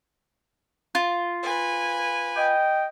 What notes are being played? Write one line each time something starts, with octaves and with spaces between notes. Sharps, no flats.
F4
B4 G#5
D#5 G5